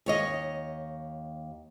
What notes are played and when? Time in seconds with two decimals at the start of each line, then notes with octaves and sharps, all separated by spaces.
0.06 D#2 C#5 D#5